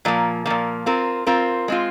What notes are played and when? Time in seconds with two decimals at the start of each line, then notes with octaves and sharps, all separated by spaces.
0.05 A#2 F3 A#3
0.46 A#2 F3 A#3
0.86 C4 F4 A#4
1.27 C4 F4 A#4
1.68 G#3 C4 F4